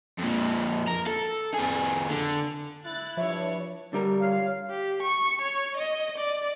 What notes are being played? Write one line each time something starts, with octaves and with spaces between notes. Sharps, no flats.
F2 A#2
A#4
A4
F2 G#4
D3
E4 F#6 A6
G2 F3 C#5 E5
D3 G3 A#4
F4 C#5 F5
G4
C#6
C#5
D#5
D5